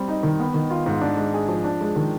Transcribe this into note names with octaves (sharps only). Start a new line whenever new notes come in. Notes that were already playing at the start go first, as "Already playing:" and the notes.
Already playing: G3 C4
D#4
D#3
B3
D#3
F4
G#2
D4
G#3
G#4
F3
D4
G#3
D#3